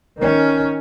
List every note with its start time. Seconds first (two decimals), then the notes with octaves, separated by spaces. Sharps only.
0.19 D#3 C#4